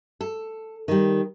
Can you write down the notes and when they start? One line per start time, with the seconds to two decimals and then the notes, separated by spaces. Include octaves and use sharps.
0.21 A4
0.88 D#3 G3